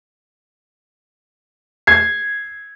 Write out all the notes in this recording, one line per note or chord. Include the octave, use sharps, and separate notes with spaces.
G#6 C7